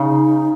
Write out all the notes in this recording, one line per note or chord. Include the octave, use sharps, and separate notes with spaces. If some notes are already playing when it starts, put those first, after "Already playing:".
Already playing: C#3 D#4